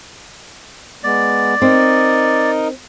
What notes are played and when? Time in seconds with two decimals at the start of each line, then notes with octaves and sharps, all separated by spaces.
1.04 G#3 B3 D5
1.62 C4 D#4 A#4 D#5